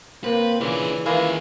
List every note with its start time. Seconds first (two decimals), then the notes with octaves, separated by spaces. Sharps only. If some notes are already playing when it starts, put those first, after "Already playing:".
0.24 C3 A#3 C4 B4
0.61 A#2 C#3 E3 D4 G#4
1.06 D#3 E3 G#3 A#3 E4 F4 G#4